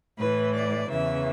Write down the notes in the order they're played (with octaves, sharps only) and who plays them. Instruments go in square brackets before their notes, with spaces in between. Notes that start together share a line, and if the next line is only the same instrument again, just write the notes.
[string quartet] A2 E3 B4
D5
E2 C#3 E3 E5